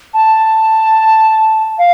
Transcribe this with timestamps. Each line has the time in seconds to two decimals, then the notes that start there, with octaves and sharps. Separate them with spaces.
0.14 A5
1.78 F5